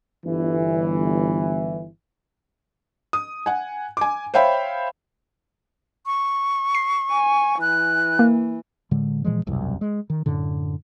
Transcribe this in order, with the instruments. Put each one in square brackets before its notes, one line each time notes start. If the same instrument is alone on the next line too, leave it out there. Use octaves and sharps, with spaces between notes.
[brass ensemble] G1 E3
[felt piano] D#6
F#5 G#5
G#5 D6
C5 C#5 E5 F5 G5 B5
[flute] C#6
[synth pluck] C7
[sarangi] G#5
[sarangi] E3 [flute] F#6
[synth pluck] A#3
[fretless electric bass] A2 D3 G#3
A#2 E3 F3 G#3
E1 C2 F#2 B2
G#3
D#3
F#2 A2 D3